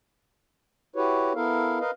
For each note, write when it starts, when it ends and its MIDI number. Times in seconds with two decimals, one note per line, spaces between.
0.96 1.33 64
0.96 1.33 66
0.96 1.33 67
0.96 1.33 71
0.96 1.33 73
1.35 1.79 59
1.35 1.79 64
1.35 1.79 69
1.35 1.79 70
1.35 1.79 77
1.80 1.91 70
1.80 1.91 71
1.80 1.91 75
1.80 1.91 77